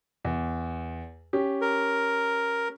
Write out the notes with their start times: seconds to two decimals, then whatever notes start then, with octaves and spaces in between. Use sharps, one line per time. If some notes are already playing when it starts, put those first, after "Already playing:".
0.25 E2
1.33 C#4 G4
1.61 A#4